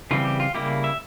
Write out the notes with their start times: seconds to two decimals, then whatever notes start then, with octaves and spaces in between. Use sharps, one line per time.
0.11 C#3 E3 G3 C4 F4
0.25 G4
0.40 F4
0.55 C#3 G3 A#3 E4 G4
0.84 E5